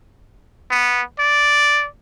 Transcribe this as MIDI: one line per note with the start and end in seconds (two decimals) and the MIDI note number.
0.71 1.02 59
1.20 1.87 74